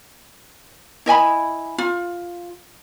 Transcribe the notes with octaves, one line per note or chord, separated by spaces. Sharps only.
E4 D#5 G#5 B5
F4